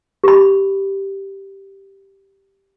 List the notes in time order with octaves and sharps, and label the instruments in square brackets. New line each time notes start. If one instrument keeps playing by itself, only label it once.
[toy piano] G4 B5